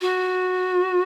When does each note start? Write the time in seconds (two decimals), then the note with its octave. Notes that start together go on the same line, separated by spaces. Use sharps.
0.01 F#4